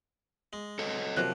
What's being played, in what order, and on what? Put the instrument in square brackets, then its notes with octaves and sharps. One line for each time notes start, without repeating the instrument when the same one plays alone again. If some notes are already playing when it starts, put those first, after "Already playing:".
[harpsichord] G#3
[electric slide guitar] A4 C#5 D#5
[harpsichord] C3 [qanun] F3 F#3 A#3 [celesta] F#6